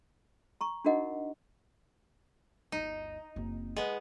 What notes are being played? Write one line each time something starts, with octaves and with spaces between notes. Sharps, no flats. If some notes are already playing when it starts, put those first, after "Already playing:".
A#5 C#6
D4 D#4 F#4 A#4 D#5 F#5
G1 D2 D#4
F#1 C4
G#3 B3